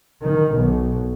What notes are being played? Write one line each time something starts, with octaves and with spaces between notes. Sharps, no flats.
D#3
B1